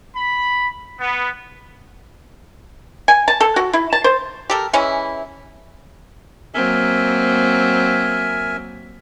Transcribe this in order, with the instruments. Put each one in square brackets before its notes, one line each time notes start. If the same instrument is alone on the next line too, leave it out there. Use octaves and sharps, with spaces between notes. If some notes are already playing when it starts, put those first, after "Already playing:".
[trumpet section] B5
B3
[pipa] G#5
A5
A4
F#4
E4
A5
C5
G4 A4 A#4
E3 G#3 C#4 E4
[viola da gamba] F#3 A#3 C4 [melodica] A#4 E5 G#5